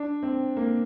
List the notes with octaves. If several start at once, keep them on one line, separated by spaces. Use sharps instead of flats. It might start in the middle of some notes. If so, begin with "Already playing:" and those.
Already playing: D4
C4
A#3